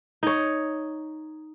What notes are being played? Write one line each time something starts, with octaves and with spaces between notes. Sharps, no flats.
D#4 C#5